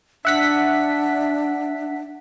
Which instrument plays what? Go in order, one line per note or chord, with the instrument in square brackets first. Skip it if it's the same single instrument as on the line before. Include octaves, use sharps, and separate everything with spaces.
[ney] D4 [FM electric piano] E5 F#5 B6